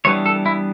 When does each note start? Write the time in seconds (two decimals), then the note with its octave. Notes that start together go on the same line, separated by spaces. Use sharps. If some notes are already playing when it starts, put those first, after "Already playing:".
0.05 E3 G3 B3 D4 C#5
0.26 A4
0.46 E4